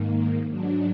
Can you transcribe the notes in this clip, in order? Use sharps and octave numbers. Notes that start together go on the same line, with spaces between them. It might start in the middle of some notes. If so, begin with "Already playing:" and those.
Already playing: G#2 D#3 A#3
G#2 F#3 D4